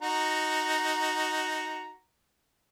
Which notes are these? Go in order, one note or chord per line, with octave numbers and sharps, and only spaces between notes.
D#4 F#4 A#5